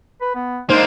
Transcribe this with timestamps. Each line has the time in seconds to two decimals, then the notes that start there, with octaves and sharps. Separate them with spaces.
0.21 B4
0.35 B3
0.70 G#3 A#3 D4 D#4 C5